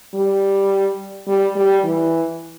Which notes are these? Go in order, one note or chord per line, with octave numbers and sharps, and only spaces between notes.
G3
G3
G3
E3